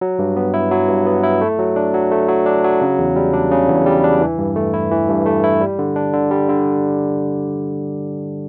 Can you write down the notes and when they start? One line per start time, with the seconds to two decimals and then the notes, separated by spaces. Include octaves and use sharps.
0.01 F#3
0.19 G2
0.36 B3
0.54 E4
0.71 F#3
0.89 G2
1.06 B3
1.23 E4
1.41 A3
1.59 F#3
1.76 D4
1.94 F#3
2.11 A3
2.29 F#3
2.46 D4
2.64 F#3
2.81 C#3
2.98 E2
3.16 G3
3.33 D4
3.51 C#3
3.69 E2
3.86 G3
4.04 D4
4.21 E3
4.38 G2
4.56 A3
4.74 E4
4.91 E3
5.09 G2
5.26 A3
5.44 E4
5.61 G3
5.79 D3
5.96 D4
6.14 D3
6.31 G3
6.49 D3